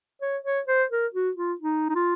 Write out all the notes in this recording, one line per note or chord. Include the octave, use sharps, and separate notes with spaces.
C#5
C#5
C5
A#4
F#4
F4
D#4
D#4
F4